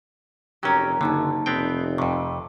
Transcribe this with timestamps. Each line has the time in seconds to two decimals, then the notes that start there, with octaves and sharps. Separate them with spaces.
0.63 F1 F#3 C#4 G4 A#4 C#5
1.01 F#1 D3 A#3 D#4 A5
1.46 F1 B3 C4 G5
1.98 F2 C3 C#6